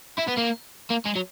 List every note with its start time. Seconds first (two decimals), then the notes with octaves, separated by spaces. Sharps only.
0.18 E4
0.28 B3
0.37 A#3
0.90 A#3
1.05 G#3
1.15 F#3